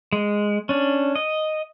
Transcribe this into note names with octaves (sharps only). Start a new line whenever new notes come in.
G#3
C#4 D4
D#5